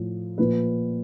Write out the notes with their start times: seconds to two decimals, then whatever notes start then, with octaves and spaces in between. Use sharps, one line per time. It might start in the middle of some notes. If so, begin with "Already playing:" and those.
Already playing: A2 F3
0.38 A#2 F3 B4